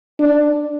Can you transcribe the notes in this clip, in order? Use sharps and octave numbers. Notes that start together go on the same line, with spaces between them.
D4